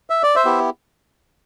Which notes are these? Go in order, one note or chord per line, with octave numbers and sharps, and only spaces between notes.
E5
D5
C5 E5
B3 E4 G4